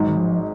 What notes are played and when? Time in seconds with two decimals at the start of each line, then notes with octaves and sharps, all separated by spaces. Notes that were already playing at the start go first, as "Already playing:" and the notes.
Already playing: G#1 G#2 F#3
0.08 D#3
0.17 F3